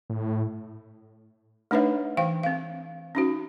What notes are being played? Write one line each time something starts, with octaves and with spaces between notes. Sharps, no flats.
A2
A3 D4 D#4 B4 C#5 E5
E3 F5 G5
C4 F5
C#4 D#4 F#4